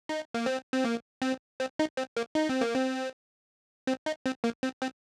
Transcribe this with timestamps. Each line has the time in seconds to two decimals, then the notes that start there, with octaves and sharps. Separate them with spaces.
0.09 D#4
0.34 A#3
0.46 C4
0.73 C4
0.84 A#3
1.22 C4
1.60 C4
1.79 D#4
1.97 C4
2.17 A#3
2.35 D#4
2.49 C4
2.61 A#3
2.75 C4
3.87 C4
4.06 D#4
4.26 C4
4.44 A#3
4.63 C4
4.82 C4